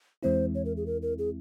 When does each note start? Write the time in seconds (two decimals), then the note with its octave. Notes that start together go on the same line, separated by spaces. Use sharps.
0.23 E2 E3 G#3 C4 E4 C5
0.55 C#5
0.65 A#4
0.77 G#4
0.86 A#4
1.02 A#4
1.19 G#4